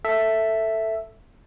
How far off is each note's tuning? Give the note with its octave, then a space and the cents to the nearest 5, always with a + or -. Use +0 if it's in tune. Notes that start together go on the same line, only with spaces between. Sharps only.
A4 +10 E5 +0